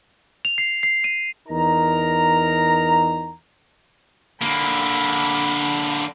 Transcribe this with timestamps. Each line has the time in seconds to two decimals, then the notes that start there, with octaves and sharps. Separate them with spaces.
0.45 F7
0.58 C7
0.83 C7
1.04 D#7
1.48 E2 D#4 A#4 A#5
4.41 D3 A#3 B5